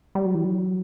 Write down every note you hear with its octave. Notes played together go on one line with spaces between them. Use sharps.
G3
F#3
E3
F#3